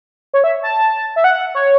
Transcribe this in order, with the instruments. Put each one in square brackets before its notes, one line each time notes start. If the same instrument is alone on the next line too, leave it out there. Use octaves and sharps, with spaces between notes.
[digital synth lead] C#5
E5
A5
E5
F#5
C#5